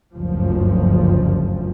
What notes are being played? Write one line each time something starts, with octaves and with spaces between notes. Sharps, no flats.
F#1 D2 G2 F3